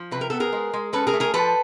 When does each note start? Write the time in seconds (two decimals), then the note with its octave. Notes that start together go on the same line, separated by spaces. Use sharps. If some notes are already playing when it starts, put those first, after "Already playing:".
Already playing: F3
0.11 C3 B4
0.21 A#4
0.30 B3 A4
0.40 G#4 A#4
0.52 G#3
0.73 G#3
0.93 C#4 A4 B4
1.07 G#4 A#4
1.13 A3
1.20 G#4 A#4
1.34 F3 A4 B4